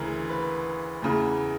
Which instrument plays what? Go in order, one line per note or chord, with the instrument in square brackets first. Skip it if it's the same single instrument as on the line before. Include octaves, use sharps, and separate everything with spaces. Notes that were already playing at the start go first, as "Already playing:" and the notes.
Already playing: [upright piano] D2 C#3 E3 A#4
B4
E2 C#3 E3